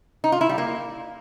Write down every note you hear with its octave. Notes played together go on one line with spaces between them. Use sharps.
D#4
F4
E4
G3
A#3